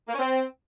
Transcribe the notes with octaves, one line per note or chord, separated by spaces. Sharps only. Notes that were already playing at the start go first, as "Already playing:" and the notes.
A#3
C#4
C4